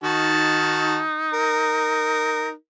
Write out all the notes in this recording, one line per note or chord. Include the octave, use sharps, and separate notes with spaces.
D#3 D#4 F#4 A5
A#4